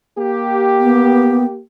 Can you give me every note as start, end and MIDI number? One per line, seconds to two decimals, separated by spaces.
0.17 1.59 58
0.17 1.59 67
0.81 1.45 59